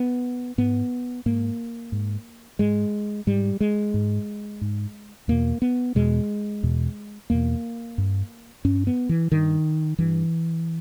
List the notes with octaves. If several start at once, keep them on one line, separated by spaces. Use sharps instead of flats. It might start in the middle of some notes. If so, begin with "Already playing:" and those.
Already playing: B3
G#2 B3
G#2 A#3
G#2
G#2 G#3
G#2 G3
G#3
G#2
G#2
E2 B2 A#3
B3
E2 B2 G#3
E2 B2
E2 B2 A#3
G2
G2 C#4
B3
E3
G2 D#3
G2 E3